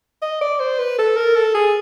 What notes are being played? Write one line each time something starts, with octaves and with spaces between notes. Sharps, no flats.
D#5
D5
C5
B4
A4
A#4
A4
G#4